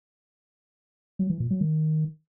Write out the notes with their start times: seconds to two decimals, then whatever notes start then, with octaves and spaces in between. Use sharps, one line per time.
1.19 F#3
1.30 E3
1.40 A#2
1.51 F#3
1.61 D#3